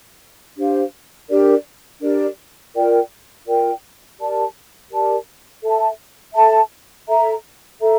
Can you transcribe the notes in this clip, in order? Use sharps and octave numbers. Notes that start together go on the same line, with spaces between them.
D4 G4 C5 F5
D4 G4 A#4 D5
D4 G4 A#4 D5
F4 A#4 D5 G5
F4 A#4 D5 G5
G4 A#4 D5 A5
G4 A#4 D5 A5
A4 E5 A5
A4 E5 A5
A4 E5 A#5
A4 E5 A#5